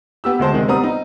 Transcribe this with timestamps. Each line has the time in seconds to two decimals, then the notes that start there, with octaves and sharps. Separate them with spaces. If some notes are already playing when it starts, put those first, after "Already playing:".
0.24 B3 G4 E6
0.39 D2 G#3 C5 A5
0.53 C3 D#3 G#3
0.68 G3 B3 C4 A#5 D#6
0.84 D#4